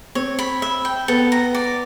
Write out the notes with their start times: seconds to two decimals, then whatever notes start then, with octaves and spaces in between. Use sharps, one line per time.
0.15 C4 C#5
0.39 B5
0.62 E5
0.85 G5
1.08 B3 A4
1.32 A#5
1.55 D5